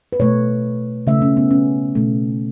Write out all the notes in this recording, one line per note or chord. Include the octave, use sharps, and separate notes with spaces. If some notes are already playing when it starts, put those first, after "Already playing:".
B4
B2 A3 C#5
C#3 A3 E5
C#4
B3
C#4
B2 A3